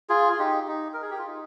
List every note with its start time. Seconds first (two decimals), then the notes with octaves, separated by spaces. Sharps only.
0.09 F4 G#4
0.32 F4
0.39 D#4 G4
0.68 D#4
0.93 A#4
1.02 G#4
1.10 G4
1.19 F4
1.27 D#4